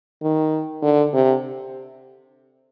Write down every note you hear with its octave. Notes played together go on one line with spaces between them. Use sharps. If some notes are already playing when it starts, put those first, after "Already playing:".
D#3
D3
C3